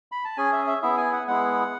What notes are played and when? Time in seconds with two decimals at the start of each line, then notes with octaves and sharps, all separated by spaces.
0.12 B5
0.25 A5
0.37 C#4 G#4 G#5
0.52 E5
0.67 E5
0.82 B3 E4 G#4 E5
0.97 G#5
1.12 F#5
1.27 G#3 B3 E4 G#4 F#5